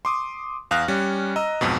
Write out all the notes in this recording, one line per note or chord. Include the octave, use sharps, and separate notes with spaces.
C6 D6 D#6
E2 F5 D#6 F6 F#6 A#6
G3 C#4
D#5 A#5 E6
B1 F2 G#2 B2